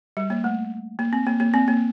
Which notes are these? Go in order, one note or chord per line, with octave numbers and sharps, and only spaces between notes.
G3
A#3
A3
A#3
C4
A#3
A#3
C4
A#3